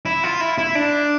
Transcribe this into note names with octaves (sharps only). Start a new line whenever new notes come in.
E4
F4
E4
E4
D4